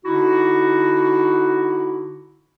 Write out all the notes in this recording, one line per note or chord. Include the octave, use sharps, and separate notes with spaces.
D3 D#4 E4 F#4